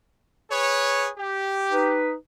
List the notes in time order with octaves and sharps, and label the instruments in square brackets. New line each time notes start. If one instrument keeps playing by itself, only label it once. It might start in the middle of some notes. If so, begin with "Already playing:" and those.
[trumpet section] G#4 B4 C#5
G4
[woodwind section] D#4 B4